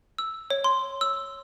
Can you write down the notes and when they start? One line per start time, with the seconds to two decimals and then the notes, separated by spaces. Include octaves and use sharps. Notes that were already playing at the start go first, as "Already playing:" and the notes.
0.18 E6
0.50 C#5
0.64 C6
1.01 E6